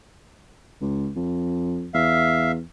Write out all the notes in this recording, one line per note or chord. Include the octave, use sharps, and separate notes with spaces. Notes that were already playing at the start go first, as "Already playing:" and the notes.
C#2
F2
E2 E5 F5